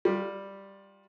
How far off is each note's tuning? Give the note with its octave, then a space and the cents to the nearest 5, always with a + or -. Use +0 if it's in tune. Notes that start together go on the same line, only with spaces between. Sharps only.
G3 +5 F4 +20